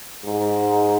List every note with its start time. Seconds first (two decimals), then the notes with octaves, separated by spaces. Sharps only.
0.25 G#2